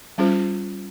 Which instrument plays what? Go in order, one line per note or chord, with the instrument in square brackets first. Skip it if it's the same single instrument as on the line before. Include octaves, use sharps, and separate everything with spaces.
[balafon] G3 C#4 F4 G#4 C5